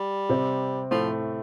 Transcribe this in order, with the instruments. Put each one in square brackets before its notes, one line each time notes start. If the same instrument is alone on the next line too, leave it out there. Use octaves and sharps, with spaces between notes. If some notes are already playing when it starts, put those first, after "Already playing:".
Already playing: [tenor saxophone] G3
[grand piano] C3 C4
[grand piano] A2 A3 [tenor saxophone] F3